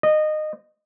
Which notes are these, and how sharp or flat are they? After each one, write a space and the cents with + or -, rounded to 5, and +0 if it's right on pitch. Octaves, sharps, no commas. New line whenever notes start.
D#5 -20